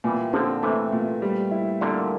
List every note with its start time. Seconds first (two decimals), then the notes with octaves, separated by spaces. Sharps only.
0.04 A#2 E3 G3
0.33 D3 F3 C4
0.63 C3 E3 A3
0.92 A#2
1.22 G3
1.51 E4
1.81 A#2 D3 A#3